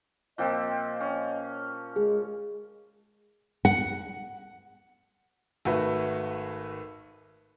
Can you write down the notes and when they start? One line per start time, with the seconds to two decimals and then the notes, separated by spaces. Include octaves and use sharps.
0.38 A#2 F3 C4 D#5
1.01 C#4
1.96 G#3 G#4
3.65 F#5
5.65 G#1 A3 F#4 B4